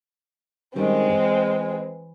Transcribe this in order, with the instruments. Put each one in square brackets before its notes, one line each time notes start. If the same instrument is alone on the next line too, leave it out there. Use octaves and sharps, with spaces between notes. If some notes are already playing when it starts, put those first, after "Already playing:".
[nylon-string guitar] D#3 G3 C#4 [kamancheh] G#3 C4
[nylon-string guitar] E3